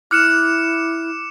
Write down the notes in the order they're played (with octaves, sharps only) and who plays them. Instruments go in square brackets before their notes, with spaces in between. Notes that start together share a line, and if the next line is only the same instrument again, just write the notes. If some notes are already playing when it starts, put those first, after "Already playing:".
[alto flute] E4 [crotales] D6 C#7 E7 [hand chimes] F6 F#6